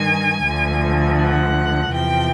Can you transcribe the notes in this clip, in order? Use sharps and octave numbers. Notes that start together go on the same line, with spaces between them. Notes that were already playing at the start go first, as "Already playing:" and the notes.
Already playing: G2 D#3 G#5
D2 D3 F3
F#5
E2 C3 F3 G5